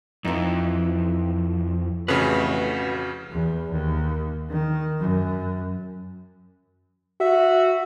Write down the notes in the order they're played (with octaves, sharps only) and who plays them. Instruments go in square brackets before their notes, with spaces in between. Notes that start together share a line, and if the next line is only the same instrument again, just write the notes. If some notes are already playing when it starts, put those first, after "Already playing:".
[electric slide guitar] F2 [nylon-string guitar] E3 D#4
[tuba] A1 [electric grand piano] F2 C#3 [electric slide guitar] F#4 B4
[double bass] E2
D#2
D#3
F#2
[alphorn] F#4 [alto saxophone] E5